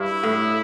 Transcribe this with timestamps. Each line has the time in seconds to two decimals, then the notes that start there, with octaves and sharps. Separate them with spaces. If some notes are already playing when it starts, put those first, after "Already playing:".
Already playing: G2 E4
0.23 A2